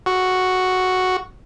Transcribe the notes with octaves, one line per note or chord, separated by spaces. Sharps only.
F#4